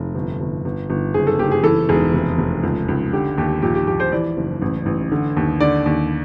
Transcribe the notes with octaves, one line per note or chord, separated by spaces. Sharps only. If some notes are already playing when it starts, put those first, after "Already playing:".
Already playing: F1
G1
G1
G1
G1
F#1 G#4
A4
F#1 G4
G#4
E3 A4
E1 G#4
F1
F1
C#2
C#2
D3 G4
D#2 G4
A#1 G4
G4
A#1 G4
C5
E3 D5
F#1
A1
A1
D3
D#2
D3 D5
D#2